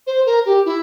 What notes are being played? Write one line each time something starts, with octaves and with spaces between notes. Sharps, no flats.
C5
A#4
G4
E4